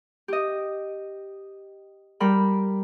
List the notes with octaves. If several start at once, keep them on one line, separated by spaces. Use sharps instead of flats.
G4 D#5
G3 A#4 G5 B5